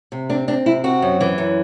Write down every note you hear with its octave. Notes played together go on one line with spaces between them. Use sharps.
C3
C4 D4
C4 D4
C3 E4
C4 F#4
F#2
E3
F#2